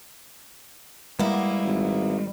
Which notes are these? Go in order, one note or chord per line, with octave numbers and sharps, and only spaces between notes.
G3 G#3 A#3 B3 E4
G#1